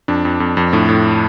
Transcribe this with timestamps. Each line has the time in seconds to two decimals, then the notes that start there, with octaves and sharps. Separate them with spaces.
0.08 F2 D4
0.25 F2
0.40 F2
0.57 F2
0.73 A2 D4
0.89 A2